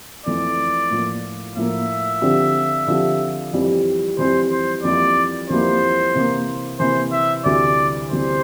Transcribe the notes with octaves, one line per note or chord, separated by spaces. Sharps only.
F2 E3 A3 D5
A2 F3 A#3
A2 F3 A#3 E5
D3 F3 C4 G4
D3 F3 C4 G4
F2 E3 G3 C4 G4
F2 E3 G3 C4 G4 C5
C5
F2 E3 G3 A#3 E4 D5
F2 E3 G3 A#3 E4 C5
C3 E3 A#3
C3 E3 A#3 C5
E5
D2 C3 E3 G3 D5
D2 C3 E3 G3 C5